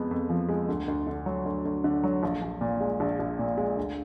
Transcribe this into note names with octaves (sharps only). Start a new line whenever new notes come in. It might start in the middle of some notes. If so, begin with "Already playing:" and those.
Already playing: F2 F3 G#3 B3
F2
F3
G#3
D2
D2
D3
F#3
D2
D2
D3
F#3
A#1
A#1
A#2
G#3
A#1
A#1
A#2
G#3
D2